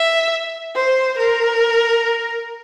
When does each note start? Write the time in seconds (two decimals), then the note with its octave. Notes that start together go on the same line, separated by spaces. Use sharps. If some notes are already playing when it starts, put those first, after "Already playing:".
Already playing: E5
0.75 C5
1.18 A#4